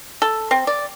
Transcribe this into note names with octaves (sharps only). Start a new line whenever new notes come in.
A4
C4
D5